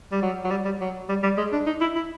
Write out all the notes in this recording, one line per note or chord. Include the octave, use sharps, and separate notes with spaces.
G3
F#3
F#3
G3
G3
F#3
G3
G3
G#3
D4
D#4
E4
E4